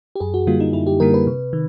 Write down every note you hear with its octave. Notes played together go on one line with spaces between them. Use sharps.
G4
F#2 G#4
F#4
D3 G3 A#3 F4
D#4
F#2 E4
G4
D3 G3 A#3 A#4
B4
C3
D#3